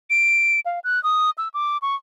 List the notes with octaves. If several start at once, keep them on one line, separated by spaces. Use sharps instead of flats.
D7
F5
F#6
D#6
E6
D6
C#6